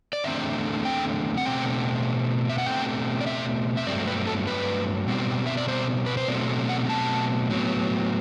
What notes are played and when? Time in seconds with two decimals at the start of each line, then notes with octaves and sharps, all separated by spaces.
0.13 D5
0.24 E2 D3 A3 C4 E5
0.85 G5
1.37 F#5
1.45 B2 A3 C4 G5
2.50 E5
2.58 F#5
2.66 B2 A3 C4 G5
3.21 D5
3.27 E5
3.77 E5
3.87 G2 F#3 A3 C4 D5
4.07 B4
4.27 A4
4.47 B4
5.08 B2 G3 C4
5.47 E5
5.57 D5
5.68 C5
6.06 B4
6.17 C5
6.28 B2 F#3 A3 C4 D5
6.69 F#5
6.90 A5
7.50 A2 F#3 B3